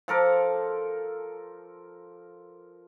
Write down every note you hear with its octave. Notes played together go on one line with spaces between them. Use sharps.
F3 A4 A#4 D6